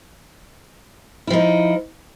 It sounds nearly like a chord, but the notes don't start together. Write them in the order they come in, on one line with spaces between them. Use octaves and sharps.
E4 F3 D#4